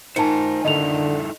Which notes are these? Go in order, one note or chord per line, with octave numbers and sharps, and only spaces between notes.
D#3 F4 C5 G#5 A5 C#7
D3 D#4 E4 A4 D#5 F7